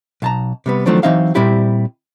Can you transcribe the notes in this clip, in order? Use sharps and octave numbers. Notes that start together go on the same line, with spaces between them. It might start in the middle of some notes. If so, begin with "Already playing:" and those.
B1 A5 A#5
C3 G3 B3
D#3 F3 F#3 A3 C4 D4
E3 F#3 C4 D#4 E5 F5
A#2 G3 C4 E4 G4